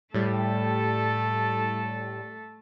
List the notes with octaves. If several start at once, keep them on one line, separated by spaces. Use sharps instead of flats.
A2 G3 A3 A4